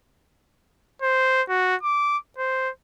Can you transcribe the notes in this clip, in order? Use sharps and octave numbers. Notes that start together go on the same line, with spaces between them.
C5
F#4
D6
C5